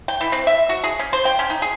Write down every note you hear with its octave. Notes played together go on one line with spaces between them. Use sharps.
G5
E3
C4
E5
F#4
G#4
C#4
C5
G5
C#4
D#4
G#4